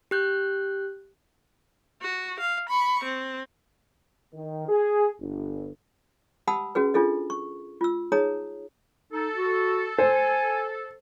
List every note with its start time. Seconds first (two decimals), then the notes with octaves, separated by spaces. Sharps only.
0.11 G4 F#6 G6
2.02 F#4
2.40 F5
2.69 B5 C#6
3.04 C4
4.34 D#3
4.69 G#4
5.21 G1
6.47 G4 F#5 A5 B5 D#6 E6
6.75 C#4 F#4 G#4 B4
6.94 D4 F4 G#4 A4 D#5
7.30 C#6
7.81 F4 E6
8.12 D#4 G#4 C#5 A#5 D#6
9.13 D#4 A4
9.34 F#4
9.99 C5 G#5